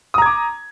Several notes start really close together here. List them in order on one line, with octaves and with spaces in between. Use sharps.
D#6 A#5 G#6 D6